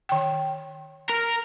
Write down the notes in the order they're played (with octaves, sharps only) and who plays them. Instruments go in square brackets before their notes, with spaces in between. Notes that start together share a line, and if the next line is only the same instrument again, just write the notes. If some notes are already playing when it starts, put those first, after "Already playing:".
[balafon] D#3 G5
[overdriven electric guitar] A#4